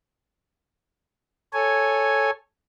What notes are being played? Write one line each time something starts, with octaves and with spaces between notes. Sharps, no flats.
A4 C#5 G#5